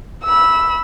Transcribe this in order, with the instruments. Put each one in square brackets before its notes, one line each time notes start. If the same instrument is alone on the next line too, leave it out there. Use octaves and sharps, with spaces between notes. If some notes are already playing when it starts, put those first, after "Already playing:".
[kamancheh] B5 E6